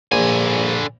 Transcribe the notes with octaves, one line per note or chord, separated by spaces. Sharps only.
A#1 D3 G#5